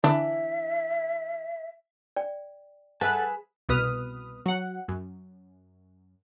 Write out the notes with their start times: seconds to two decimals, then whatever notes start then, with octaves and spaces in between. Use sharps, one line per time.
0.04 D3 E3 D4 E5
2.16 D5 G5
3.01 G#4 A4 B4 E5 F#5 A5
3.69 C2 B2 B4 D#6 F6
4.46 F#3 F#5
4.88 F#2